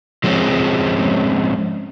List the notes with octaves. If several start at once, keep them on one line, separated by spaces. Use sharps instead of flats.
F3 G#3 C4 C#4